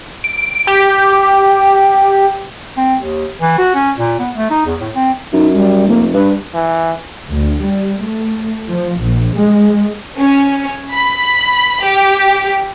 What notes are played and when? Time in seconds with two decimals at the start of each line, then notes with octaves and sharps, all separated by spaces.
0.24 D7
0.67 G4
2.77 C4
3.00 D#2
3.41 E3
3.58 F#4
3.75 C#4
3.98 A#2
4.19 B3
4.36 A3
4.51 D#4
4.66 E2
4.81 A2
4.95 C4
5.33 F#2 D#4
5.54 G3
5.88 F1 A#3
6.13 G2 B4
6.54 E3
7.28 D2
7.62 G3
8.01 A3
8.69 F3
9.00 A#1
9.35 G#3
10.17 C#4
10.95 B5
11.84 G4